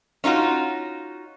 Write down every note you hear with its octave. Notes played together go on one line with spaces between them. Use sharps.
C#4 D#4 F4 F#4